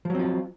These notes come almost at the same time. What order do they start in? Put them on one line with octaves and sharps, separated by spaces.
F3 F#3 C4 F4